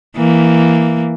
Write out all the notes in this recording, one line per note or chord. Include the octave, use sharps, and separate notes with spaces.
E3 A#3